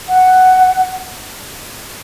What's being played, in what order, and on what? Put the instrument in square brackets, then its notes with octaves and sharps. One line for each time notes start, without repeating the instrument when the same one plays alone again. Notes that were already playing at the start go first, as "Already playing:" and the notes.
[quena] F#5